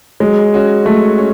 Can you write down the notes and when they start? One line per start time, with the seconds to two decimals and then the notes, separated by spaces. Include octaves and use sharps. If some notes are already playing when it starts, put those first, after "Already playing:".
0.20 F#3 G#3
0.54 C#4 F#4
0.86 F#3 A3
1.18 C#4